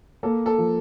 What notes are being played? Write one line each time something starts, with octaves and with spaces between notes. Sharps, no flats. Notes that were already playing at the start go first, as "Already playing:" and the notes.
A#3 A4
A4
F3